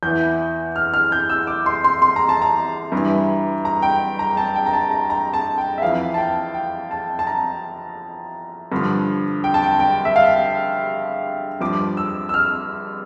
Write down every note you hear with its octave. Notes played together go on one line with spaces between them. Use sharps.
E2 E3 G6
F6
F6
G6
E6
D6
C6
C6
C6
A#5
A5
A#5
G2 E3
A#5
G5
A#5
A5
G5
A#5
A5
A#5
A#5
A5
G5
E5
F2 E3 F5
A5
G5
G5
A5
A5
A#5
G2 D3 F3
G5
A5
G5
G5
E5
F5
G2 F3 D6
E6
E6
F6